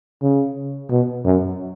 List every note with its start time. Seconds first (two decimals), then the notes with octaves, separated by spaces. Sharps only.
0.22 C#3
0.91 B2
1.25 F#2